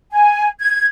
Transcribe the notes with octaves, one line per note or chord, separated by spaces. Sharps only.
G#5
G#6